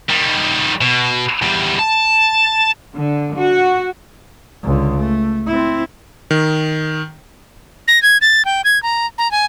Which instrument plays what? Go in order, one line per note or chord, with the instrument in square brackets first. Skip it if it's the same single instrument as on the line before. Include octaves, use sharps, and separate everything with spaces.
[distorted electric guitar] D#3 G3
B2
E2 G3
A5
[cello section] D3
F#4
[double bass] C#2 D3
A3
C4 E4
[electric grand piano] D#3
[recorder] A#6
G#6
A6
G5
G#6
A#5
A#5
G#5